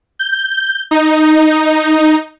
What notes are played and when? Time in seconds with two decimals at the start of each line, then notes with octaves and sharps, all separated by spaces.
0.19 G6
0.91 D#4